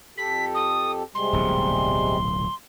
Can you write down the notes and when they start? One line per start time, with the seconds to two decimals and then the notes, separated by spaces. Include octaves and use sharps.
0.17 F2 G4 A4 B6
0.54 D#6
1.14 C3 G3 G#3 C6
1.33 D1 B1 A#2